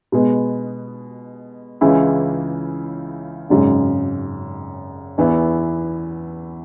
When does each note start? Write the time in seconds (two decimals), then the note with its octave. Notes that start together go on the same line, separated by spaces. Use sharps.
0.12 B2 G#3 B3
1.81 C#2 C#3 E3 G#3 E4
3.50 G#1 F#2 C#3 G#3
5.18 E2 E3 B3 E4